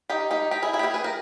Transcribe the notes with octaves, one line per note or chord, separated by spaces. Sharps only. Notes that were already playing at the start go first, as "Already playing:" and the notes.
D#4 G4
D#4 G4
D#4 G4
E4 G#4
E4 G#4
G4
E4 G#4
G#4 B4
G4 A#4